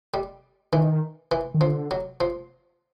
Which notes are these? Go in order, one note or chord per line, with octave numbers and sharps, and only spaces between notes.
G3
D#3 E3
E3
D#3
D3 F3
F#3
F3